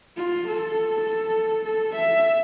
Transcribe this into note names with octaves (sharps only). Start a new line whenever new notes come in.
F4
A4
A4
A4
E5